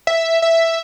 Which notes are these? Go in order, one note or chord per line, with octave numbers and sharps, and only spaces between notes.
E5
E5